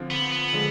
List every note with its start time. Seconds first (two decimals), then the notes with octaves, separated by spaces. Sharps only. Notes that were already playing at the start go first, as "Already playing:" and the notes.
Already playing: D3 F3 C4 F4
0.10 B3
0.32 B3
0.53 D3 F3 G#3